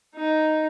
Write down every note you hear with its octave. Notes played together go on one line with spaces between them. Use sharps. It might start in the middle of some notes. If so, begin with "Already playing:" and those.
D#4